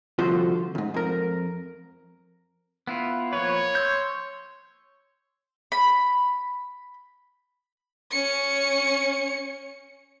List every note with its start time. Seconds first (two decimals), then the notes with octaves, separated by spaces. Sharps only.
0.19 C2 D3 F3 F4 F#4 C5
0.75 D2 G#2
0.94 F2 A#4
2.87 B3 E4 F4
3.33 F3 A#3 B4 C#5
3.75 C6 E6 G6
5.72 B5
8.11 C#4 C#7